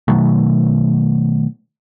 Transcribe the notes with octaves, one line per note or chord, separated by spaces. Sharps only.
B2 D#3 F#3 A3